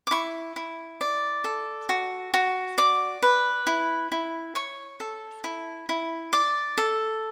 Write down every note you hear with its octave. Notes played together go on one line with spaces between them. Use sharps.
D6
E4 C#6
E4
D5
A4
F#4
F#4
D5 D6
B4
E4
E4
C#5 C#6
A4
E4
E4
D5 D6
A4